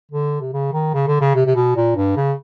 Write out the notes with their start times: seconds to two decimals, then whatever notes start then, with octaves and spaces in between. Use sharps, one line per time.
0.11 D3
0.41 C3
0.53 C#3
0.73 D#3
0.94 C#3
1.07 D3
1.21 C#3
1.35 C3
1.46 C3
1.55 B2
1.76 A#2
1.96 G2
2.16 C#3